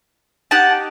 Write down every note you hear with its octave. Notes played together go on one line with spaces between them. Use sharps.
D#4 G4 F#5 A5